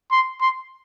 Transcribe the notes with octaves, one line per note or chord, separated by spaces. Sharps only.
C6
C6